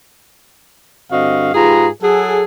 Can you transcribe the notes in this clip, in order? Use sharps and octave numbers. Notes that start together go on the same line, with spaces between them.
G2 D3 C4 F#4 D#5 F5
G#2 F4 G4 G#4 B4 A#5
F#3 G#4 A4